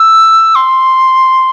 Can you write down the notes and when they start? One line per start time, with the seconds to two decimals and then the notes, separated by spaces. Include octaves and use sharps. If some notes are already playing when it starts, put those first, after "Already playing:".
Already playing: E6
0.55 C6